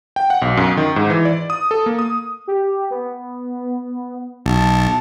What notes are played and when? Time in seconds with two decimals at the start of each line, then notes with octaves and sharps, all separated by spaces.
0.16 G5
0.30 F#5
0.42 B1
0.57 F#2
0.77 D#3
0.96 G#2
1.10 E3
1.25 D5
1.50 D#6
1.71 A4
1.86 A#3
1.99 D#6
2.48 G4
2.91 B3
4.46 B1 A5